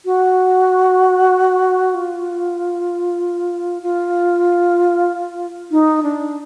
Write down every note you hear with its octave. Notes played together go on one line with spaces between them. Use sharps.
F#4
F4
F4
D#4
D4